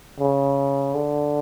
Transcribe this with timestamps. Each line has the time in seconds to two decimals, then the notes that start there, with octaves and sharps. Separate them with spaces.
0.20 C#3
0.95 D3